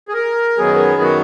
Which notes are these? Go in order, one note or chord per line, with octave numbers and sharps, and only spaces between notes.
G#4
A#4
F#2 D#3 F#3 B3 G#4
F#4